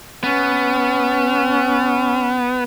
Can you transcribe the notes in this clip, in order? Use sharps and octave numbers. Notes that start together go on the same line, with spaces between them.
B3 C#4